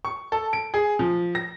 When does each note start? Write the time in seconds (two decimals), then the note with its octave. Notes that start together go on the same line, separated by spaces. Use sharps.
0.05 C#6
0.32 A4
0.53 D7
0.74 G#4
0.99 F3
1.35 A#6